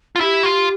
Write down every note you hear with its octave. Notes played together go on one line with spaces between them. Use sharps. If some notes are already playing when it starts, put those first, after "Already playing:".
F4
E4 G4
F4